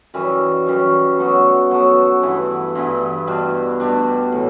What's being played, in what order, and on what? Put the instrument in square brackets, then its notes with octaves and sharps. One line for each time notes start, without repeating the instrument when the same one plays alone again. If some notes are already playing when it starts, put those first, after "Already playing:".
[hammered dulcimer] F#2 E3 G3
F#2 E3 G3
F#3 B3 F#4 A4
F#3 B3 F#4 A4
G2 E3 B3 E4
G2 E3 B3 E4
B2 G3 D4
B2 G3 D4
A2 E3